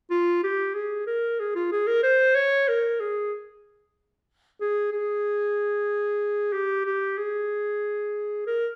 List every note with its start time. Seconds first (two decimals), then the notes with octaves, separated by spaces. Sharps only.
0.11 F4
0.43 G4
0.75 G#4
1.07 A#4
1.40 G#4
1.55 F4
1.72 G#4
1.87 A#4
2.03 C5
2.35 C#5
2.68 A#4
3.00 G#4
4.61 G#4
4.92 G#4
6.53 G4
6.86 G4
7.18 G#4
8.47 A#4